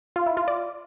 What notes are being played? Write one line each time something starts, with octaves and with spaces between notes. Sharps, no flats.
F4
E4
F4
D5